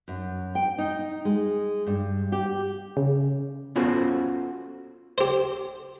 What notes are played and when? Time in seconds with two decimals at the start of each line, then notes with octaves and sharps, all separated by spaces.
0.08 F#2
0.55 G5
0.78 D#4
1.25 G#3
1.87 G2
2.32 G4
2.97 C#3
3.76 B3 C#4 F4 F#4 A4 C5
5.18 G4 C5